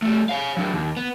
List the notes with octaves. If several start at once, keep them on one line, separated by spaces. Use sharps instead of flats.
G3 A3
C#5 F5
F#3 D4
D#2
B3